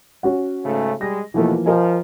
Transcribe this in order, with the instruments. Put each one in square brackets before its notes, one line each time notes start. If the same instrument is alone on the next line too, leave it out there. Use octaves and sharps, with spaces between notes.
[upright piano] C#4 F#4 F#5
[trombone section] G#2 C#3 A3
[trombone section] G3 G#3 [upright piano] A#6
[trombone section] D#2 B2 A3 [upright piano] E3 F3 A#3
[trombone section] F3 [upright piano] A#4 D#5 G#5